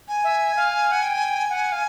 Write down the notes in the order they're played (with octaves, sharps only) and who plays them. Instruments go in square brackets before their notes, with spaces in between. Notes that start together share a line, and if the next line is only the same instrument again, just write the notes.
[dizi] G#5
[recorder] E5
F5
F#5
G5
F#5
F5